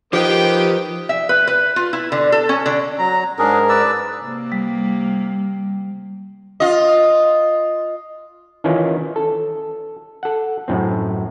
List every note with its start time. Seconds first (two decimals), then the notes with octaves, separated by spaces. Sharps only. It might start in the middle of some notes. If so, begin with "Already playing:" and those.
0.13 D#3 F3 G4 B4 G5 D#6
1.09 E5
1.29 B4
1.47 B4
1.76 F4
1.93 E4
2.12 D3
2.32 A4
2.49 C#4
2.66 D3
2.99 F#3 A#5
3.39 G#2 C#4 D4 G#4 A#4
3.69 B4 D5 E6
4.22 C3 A#3
4.52 G3
6.60 F4 D#5
8.64 D#3 E3 C#4 E4 F4
9.16 A4
10.23 A4 F#5
10.68 F#2 A2 C4